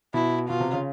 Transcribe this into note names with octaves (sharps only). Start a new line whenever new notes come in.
B2 E4
B2 F4
C3
C#3